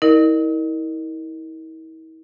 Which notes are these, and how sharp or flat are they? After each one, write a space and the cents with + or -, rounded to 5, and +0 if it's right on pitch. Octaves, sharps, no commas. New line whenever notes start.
E4 -45 A#4 -5 D#5 -40